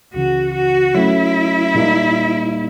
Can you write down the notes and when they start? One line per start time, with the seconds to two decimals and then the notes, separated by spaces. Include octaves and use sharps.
0.14 C#2 C#3 E3 F#4
0.54 F#4
0.94 F#3 A3 C#4 E4
1.75 A#2 G3 A#3 D#4